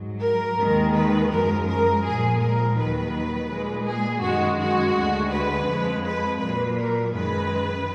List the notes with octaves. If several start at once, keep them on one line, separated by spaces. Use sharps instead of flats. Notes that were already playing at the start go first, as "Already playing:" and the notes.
Already playing: G#2 F#3
A#4
D#2 D#3 G#3
B4
F#2 F3 G#3 A#4
A#4
A#2 F3 G#3 G#4
A#4
D#2 D#3 F#3 B4
A#2 G#3
G#4
F#2 D#3 G#3 F#4
F#4
D2 D3 G#3
B4
F2 F3 G#3
B4
A#2 F#3 B4
A#4
F#2 D#3 G#3 B4